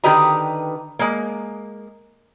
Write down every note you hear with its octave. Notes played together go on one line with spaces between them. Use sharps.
D3 D#3 G4 B4 D#5 A#5
G#3 A#3